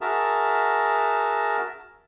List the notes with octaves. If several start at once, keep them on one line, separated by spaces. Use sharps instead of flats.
F#4 G#4 A#4 E5 A5 A#5